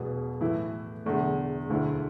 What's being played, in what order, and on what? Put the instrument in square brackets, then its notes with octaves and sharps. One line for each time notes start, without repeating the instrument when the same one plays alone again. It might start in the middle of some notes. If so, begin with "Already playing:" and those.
Already playing: [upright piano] E1 E2 B2 B3
A2 E3 A3 E4
E1 E2 D3 A3
E1 D2 D3 A3 E4